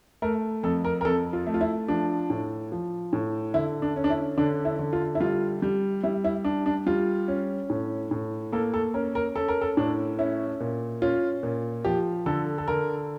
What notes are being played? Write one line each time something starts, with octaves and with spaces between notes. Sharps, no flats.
A3 A#4
F2 A4
A#4
A#4
F2 A4
F4
A3
F4
E4
F3 D4
A2
F3
A2
D3 E4
D4
C#4
D4
E4
D3 D4
E4
D3
F4
E4
G3 F4
G3
G3 E4
E4
D4
D4
G3 F4
C#4
A2
A2
A#3 A4
A4
C#4 A#4
A#4
C#4 A4
A#4
A4
A2 D4
C#4 E4
A#2
C#4 F4
A#2
F3 G4
D3 A4
A4
D3 A#4